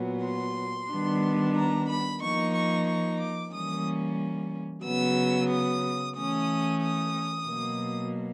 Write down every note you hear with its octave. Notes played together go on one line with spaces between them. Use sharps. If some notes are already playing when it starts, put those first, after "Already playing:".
Already playing: A#2 F#3 B3
C6
D#3 G3 B3 D4
A#5
B5
F3 A#3 D#4 C#6
C#6
C#6
D6
E3 G3 A#3 C#4 D#6
C#3 F#3 B3 E6
D#6
E3 A3 C#4 D#6
D#6
B2 F#3 A#3